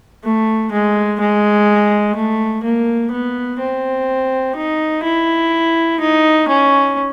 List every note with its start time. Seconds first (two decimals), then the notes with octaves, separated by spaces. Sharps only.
0.24 A3
0.72 G#3
1.20 G#3
2.15 A3
2.63 A#3
3.11 B3
3.59 C4
4.56 D#4
5.03 E4
6.00 D#4
6.48 C#4